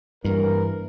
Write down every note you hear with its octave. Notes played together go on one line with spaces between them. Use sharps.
G2 E3 A#3 A#4